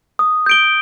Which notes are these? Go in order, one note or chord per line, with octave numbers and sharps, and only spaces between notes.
D#6
G6 D7 G7